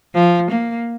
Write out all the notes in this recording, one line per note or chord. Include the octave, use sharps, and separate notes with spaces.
F3
A#3